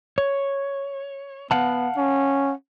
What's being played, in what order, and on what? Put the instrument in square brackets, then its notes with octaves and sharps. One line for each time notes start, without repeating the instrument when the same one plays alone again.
[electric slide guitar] C#5
[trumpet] B3 [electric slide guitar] F5 F#5 A5
[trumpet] C#4